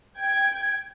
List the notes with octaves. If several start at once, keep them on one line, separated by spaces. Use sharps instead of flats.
G5 G#6